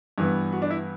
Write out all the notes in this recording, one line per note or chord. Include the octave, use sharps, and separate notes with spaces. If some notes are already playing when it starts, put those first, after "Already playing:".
G2 E3 B3
F#4
D4
E4